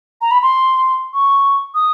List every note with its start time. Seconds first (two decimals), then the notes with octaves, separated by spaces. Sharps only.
0.21 A#5
0.31 B5
0.42 C6
1.14 C#6
1.75 D#6